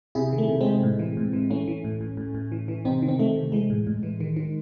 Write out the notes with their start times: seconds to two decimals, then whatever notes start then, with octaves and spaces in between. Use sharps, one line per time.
0.15 C3 E4 G#4
0.33 D#3
0.38 A3
0.49 C3
0.61 G#3 C4
0.66 C3
0.83 A2
0.99 E3
1.17 A2
1.33 E3
1.50 E3 A3 C#4
1.68 E3
1.84 A2
2.01 A2
2.17 A2
2.35 A2
2.52 E3
2.68 E3
2.85 C3 C4 D#4
3.02 D#3
3.08 C4
3.19 D#3 A3
3.36 C3
3.52 E3 G#3
3.70 A2
3.87 A2
4.03 E3
4.20 D#3
4.36 D#3